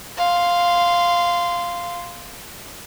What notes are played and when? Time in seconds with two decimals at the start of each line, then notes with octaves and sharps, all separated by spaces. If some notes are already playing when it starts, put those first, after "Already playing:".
0.17 F5 C6